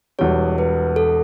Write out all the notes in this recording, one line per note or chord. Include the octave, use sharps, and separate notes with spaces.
E1 E2 B2 G3 C#5
B4
A4